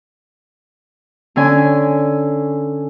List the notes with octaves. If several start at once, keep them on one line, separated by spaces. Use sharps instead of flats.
D3 C#4 G#5